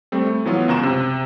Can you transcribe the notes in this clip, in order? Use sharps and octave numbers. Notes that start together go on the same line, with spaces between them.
G3 A3 C4
A3
E3 F#3 B3 F4
C#2 F#2 A#5 E7
C3